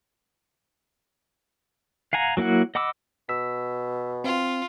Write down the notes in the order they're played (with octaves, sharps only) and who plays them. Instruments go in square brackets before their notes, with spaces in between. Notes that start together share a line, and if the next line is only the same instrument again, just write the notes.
[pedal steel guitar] F5 F#5 G#5 A#5
F#3 A#3 E4 F#4 F#5
D#5 F#5 B5 D6 E6
[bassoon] B2 [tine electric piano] E6 B6
[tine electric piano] C4 [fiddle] F4